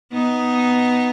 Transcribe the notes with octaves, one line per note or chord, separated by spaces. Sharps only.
B3 D#4